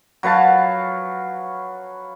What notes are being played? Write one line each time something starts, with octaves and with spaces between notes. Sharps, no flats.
F#3 B4 F5 A5